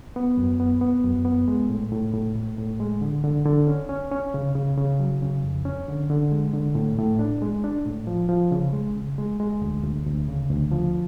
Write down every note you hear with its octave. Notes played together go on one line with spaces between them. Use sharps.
B3
F#2
B3
B3
F#2
B3
G#3
A2
A2
A2
A2
A2
G#3
D3
D3
D3
C#4
C#4
C#4
C#3
C#3
C#3
F#3
C#3
F2
C#4
D3
D3
G#3
D3
A2
A2
D4
G#3
D4
A2
F3
F3
C#3
G#3
C#3
G#3
G#3
D2
D2
D2
C#3
D2
F3